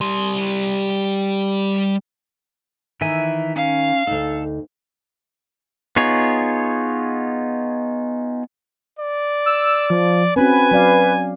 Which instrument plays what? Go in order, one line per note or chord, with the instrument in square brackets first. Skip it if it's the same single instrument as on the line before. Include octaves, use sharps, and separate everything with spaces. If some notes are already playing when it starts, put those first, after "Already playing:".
[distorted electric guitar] G3 C6
[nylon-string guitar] D#3 [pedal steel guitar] E3 E5 G#5
[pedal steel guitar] C#4 [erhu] F5
[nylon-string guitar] D2 D#4 [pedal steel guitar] A4
[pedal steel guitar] B3 D#4 F4 G#4 C#5
[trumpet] D5
[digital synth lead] E6
F3
[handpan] C4 C#4 F#4 [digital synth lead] B4 [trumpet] G#5
[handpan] F#3 D5 F5